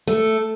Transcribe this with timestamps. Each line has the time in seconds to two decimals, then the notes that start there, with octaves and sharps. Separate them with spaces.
0.08 A3